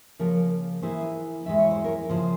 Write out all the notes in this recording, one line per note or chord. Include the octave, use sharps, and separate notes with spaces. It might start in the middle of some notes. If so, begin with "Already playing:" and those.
C#3 F3 A#3 F4 A#4 C#5
E3 A#3 E4 G#4 C5
E2 E3 G#3 E4 E5
C#5
C5
A#4 C#5
C#3 F3 A#3 F4 G#4 C5